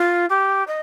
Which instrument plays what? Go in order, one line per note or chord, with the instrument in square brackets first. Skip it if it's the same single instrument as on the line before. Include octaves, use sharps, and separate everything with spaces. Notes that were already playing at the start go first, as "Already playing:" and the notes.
Already playing: [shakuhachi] F4
G4
D#5